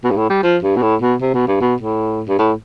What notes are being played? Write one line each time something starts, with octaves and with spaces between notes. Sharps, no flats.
B2
G2
A2
G3
F3
G2
B2
A2
B2
C3
B2
G2
B2
A2
G2
A2